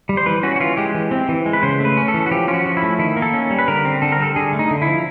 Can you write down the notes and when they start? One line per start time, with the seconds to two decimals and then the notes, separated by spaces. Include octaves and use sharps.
0.09 G3
0.17 C5
0.26 E3 B4
0.43 C#4 F#4
0.56 F#4
0.60 E3 F4
0.77 G#3 G4
0.95 E3
1.11 C4
1.29 E3
1.46 G#3
1.53 B4
1.63 C#3 C5
1.80 A3 B4
1.97 C#4
2.08 A4
2.14 E3
2.26 F#4
2.31 F3 G4
2.48 C#4 F4
2.54 F#4
2.66 F3
2.77 E4
2.83 A3
2.99 D#3 E4
3.17 A#3
3.22 A4
3.33 C#4
3.50 G3
3.59 B4
3.68 D3 A#4
3.85 C4
4.02 D3 A4
4.12 A#4
4.19 G3 A4
4.36 D3 G#4
4.53 A3
4.59 D#4
4.71 D3
4.82 E4
4.87 F3